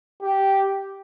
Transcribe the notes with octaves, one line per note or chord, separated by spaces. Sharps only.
G4